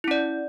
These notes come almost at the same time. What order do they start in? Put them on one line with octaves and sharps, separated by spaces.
E4 C#4 D5